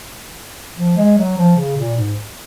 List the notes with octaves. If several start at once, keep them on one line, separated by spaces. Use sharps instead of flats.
F3
G#3
F#3
F3
C#3
A#2
G#2